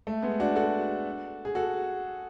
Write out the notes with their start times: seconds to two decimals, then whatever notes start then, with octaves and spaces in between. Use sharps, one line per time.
0.07 A3
0.22 G#3 B3
0.40 D4 F#4
0.56 F#4 A4
1.45 G#4
1.55 F#4 A4